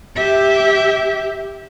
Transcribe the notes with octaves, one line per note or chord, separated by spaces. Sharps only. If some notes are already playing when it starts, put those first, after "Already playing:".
G4 E5